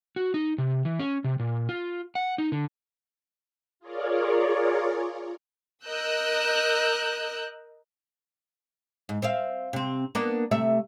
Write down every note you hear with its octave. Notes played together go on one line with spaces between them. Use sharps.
F#4
D#4
C3
E3
C#4
C3
A#2
F4
F#5
D#4
D3
F4 G#4 A#4 C#5 D5
A#4 D#5 E6 F#6 G6
G#2
C4 E5 F5
C3 C4
A#3 B3 D4
C3 A3 E5